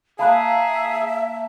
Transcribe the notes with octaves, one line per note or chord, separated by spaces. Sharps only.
A#3 G#4 E5 F5 A5 B5 F#6